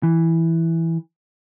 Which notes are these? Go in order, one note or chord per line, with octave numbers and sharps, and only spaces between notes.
E3